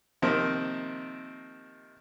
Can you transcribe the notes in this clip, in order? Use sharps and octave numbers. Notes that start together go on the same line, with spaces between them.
C3 D#3 F3 A#3